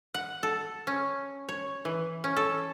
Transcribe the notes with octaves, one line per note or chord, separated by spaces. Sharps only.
F#5
A4
C#4
C#5
E3
C#4
A4